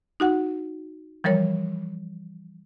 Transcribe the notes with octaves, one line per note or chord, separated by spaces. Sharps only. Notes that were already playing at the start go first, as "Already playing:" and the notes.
D#4 F#4 F#5
E3 F3 G3 A#4 C#5